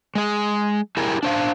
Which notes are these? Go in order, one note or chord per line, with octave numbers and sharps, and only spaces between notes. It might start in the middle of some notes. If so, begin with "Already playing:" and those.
G#3 G#4
E4 G4 G#4 A#4
D4 C5 F5